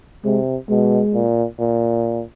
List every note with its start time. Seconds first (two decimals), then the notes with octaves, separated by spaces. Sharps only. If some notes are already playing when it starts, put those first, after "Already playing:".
0.24 C3 G#3
0.69 B2 G#3
1.14 A#2
1.60 A#2